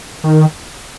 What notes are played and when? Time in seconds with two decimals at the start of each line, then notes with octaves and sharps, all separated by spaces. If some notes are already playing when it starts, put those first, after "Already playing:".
0.24 D#3